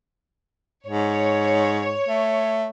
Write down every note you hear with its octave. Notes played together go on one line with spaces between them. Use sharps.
G#2 C#5
A3